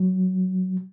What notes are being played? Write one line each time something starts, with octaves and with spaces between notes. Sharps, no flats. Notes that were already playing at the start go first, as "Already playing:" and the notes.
Already playing: F#3